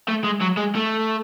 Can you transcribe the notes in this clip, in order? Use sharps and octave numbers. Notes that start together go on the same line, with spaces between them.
A3
G#3
F#3
G#3
A3